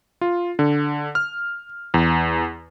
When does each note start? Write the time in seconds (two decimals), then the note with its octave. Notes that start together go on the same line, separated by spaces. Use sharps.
0.21 F4
0.59 D3
1.15 F6
1.94 E2